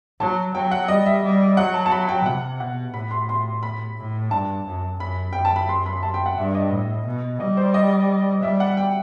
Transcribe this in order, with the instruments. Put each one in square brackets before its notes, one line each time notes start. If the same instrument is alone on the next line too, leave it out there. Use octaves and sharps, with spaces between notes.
[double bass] F#3 [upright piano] A5
[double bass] F#3 [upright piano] G5
[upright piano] F#5
[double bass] G3 [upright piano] D#5
[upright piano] E5
[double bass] G3
[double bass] F#3 [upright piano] F#5
[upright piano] A5
A5
B5
G5
[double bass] C3 [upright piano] F#5
[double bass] B2 [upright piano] F#5
[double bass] A2 [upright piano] B5
[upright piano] C6
C6
B5
[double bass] A2
[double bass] G2 [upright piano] A5
[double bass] F#2
[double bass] F#2 [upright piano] B5
[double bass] F#2 [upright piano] G5
[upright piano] A5
B5
C6
B5
A5
G5
F#5
[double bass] G2 [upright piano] E5
[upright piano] D#5
[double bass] A2
B2
[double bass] G3 [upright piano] D#5
[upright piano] C5
D#5
[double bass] G3 [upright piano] E5
[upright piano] F#5
G5